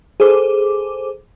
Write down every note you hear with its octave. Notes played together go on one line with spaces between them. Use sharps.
G#4 A4 C5 D6